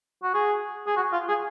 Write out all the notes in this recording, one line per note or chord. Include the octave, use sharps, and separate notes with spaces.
F#4
G#4
G#4
F#4
F4
G#4